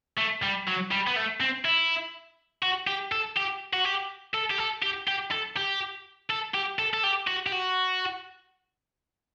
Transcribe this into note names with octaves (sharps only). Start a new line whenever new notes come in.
A3
G3
F#3
G3
B3
A3
C4
E4
F#4
G4
A4
G4
F#4
G4
A4
G4
A4
G4
G4
A4
G4
A4
G4
A4
A4
G4
F#4
G4
F#4